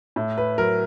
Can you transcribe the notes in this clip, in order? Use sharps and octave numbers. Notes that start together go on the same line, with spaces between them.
A2
B4
F#3 A#4